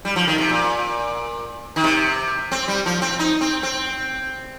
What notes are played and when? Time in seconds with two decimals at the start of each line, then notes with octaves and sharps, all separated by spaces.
0.05 G3
0.16 F3
0.27 D#3
0.38 C3
0.50 A#2
1.76 D#3
1.84 C3
2.52 C4
2.68 G3
2.86 F3
3.02 C4
3.19 D#4
3.41 C4
3.63 C4